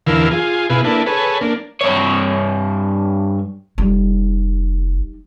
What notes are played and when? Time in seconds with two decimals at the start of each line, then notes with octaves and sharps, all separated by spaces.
0.06 E2 D3 E3 A#4 F5 E6
0.31 F4 G#4
0.70 B2 E4 G#4 B4 F5
0.84 A#3 D4 E4 A4 B4
1.06 G#4 A4 B4 C#5
1.41 A#3 D4
1.81 G2 C#5
3.78 F1 G3 D#4